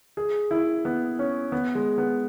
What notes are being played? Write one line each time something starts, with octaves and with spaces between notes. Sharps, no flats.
G#4
E4
B3
C#4
B3
G#3
B3